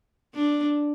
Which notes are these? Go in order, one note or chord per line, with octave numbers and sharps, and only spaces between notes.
D4